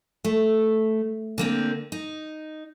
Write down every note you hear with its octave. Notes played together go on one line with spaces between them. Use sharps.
A3
D3 A#3 C4
D#4